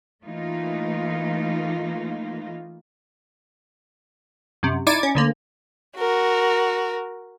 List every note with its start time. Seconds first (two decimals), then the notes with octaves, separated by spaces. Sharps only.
0.23 E3 A3 A#3 D#4 F4
4.63 F#2 C3
4.87 D#4 E4 D5 D6 G#6
5.03 C#4
5.15 D2 D3 A#3
5.97 F#4 A#4